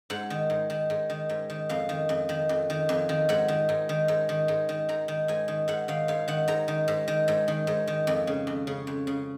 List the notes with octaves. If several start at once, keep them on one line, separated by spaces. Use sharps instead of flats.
G#2 F#5
D#3
G#2
D#3
G#2
D#3
G#2
D#3
F2 F5
D#3
F2
D#3
F2
D#3
F2
D#3
G#2 F#5
D#3
G#2
D#3
G#2
D#3
G#2
D#3
G#2 A#5
D#3
G#2 G#5
D#3
G#2 F#5
D#3 F5
G#2 F5
D#3 F#5
G#2 A#5
D#3
G#2
D#3
G#2
D#3
G#2
D#3
F2
C#3
F2
C#3
F2
C#3